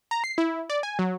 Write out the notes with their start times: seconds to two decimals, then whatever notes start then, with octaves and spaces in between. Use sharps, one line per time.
0.11 A#5
0.24 C7
0.38 E4
0.70 D5
0.83 G#5
0.99 F#3